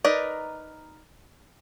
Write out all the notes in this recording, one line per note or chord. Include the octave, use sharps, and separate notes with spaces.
D#4 A#4 B4 D5